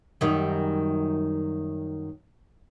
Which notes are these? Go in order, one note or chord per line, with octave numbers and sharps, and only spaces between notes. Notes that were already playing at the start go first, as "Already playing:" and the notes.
F#2 D#3 G3